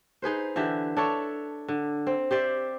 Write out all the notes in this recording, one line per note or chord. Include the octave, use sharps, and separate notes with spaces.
D#4 G#4 B4 C5
D3 E3 G4 E5
D4 A4 C#5 E5
D3
C4
G4 C5 D5 E5